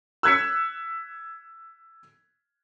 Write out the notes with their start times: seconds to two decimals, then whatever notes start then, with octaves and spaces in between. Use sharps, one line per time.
0.23 E6 F#6 G#6 B6 C#7